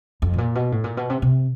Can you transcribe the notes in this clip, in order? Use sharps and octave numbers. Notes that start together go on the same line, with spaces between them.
F2
A2
A#2
B2
A2
A#2
B2
C3
C3